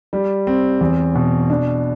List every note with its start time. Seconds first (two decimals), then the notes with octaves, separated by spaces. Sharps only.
0.13 G3
0.47 C4
0.81 E2
1.15 B2
1.50 D4